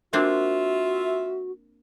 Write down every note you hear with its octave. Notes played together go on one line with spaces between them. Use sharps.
A#3 C4 D4 F4 F#4 E5